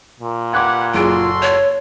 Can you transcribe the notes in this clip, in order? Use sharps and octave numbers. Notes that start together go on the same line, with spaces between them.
A#2
G4 B4 F#5 D6 F#6 G#6
F#1 F4 F#4 G#4 A4 C6 D7
C#5